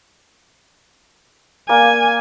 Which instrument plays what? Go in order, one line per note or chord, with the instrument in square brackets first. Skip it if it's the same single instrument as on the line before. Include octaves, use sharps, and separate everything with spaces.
[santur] A#3 D5 [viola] G#5